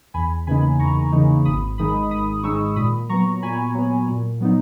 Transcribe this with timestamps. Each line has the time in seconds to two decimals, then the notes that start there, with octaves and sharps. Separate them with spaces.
0.14 E2 G#5 B5
0.47 C#3 E3 A#3 D#4 G#5 B5
0.79 E2 A#5 C#6
1.12 C#3 E3 A#3 D#4
1.45 G#1 B5 D#6
1.78 G#2 D#3 G#3 D#4 B5 D#6
2.11 G#1 B5 D#6
2.43 G#2 D#3 G#3 D#4 C#6 E6
2.76 A#2 B5 D#6
3.09 F#3 B3 A#5 C#6
3.42 A#2 G#5 B5
3.75 F#3 B3
4.08 A#2
4.40 F#3 B3 D#4